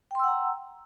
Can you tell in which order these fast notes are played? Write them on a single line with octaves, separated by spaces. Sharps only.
G5 C6 E6 F#5 A#5